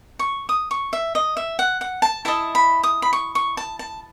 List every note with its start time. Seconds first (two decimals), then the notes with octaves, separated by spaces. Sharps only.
0.19 C#6
0.49 D#6
0.71 C#6
0.93 E5
1.15 D#5
1.37 E5
1.59 F#5
1.81 F#5
2.02 A5
2.25 E4 A4 D#5 A5
2.55 B5
2.83 D#6
3.02 B5
3.13 C#6
3.35 C#6
3.57 A5
3.79 A5